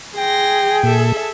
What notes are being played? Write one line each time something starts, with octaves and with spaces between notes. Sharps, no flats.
G#4 G5 C6 A#6
A#2 A4 E5